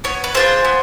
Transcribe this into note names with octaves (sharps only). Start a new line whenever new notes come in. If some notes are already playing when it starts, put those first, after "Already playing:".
B3 C#5
B4
D4 F4 G#4 C5
B3